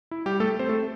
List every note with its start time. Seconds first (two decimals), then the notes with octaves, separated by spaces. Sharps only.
0.11 E4
0.26 G3 G4
0.40 A3 A4
0.59 C4 C5
0.69 A3 A4